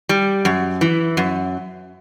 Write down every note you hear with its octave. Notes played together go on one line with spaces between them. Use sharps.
G3
F#2
E3
F#2